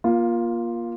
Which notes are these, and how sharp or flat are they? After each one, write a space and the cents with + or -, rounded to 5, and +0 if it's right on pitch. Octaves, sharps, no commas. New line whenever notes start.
A#3 +25 F4 +0